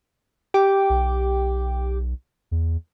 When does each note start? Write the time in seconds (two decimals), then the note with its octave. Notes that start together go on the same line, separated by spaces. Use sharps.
0.54 G4 G5 D6
0.90 B1
2.51 E2